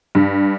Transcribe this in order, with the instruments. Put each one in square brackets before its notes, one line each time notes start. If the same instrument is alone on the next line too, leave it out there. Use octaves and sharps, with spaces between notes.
[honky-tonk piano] G2